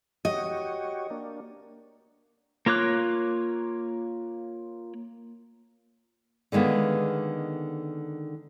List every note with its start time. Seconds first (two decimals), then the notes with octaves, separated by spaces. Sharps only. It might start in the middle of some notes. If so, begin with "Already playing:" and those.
0.25 F#4 G4 C#5 D#5
1.10 A#3 D4
2.66 A#3 F4 C#5 D6 F#6
6.52 D3 D#3 G#3 A#3 B3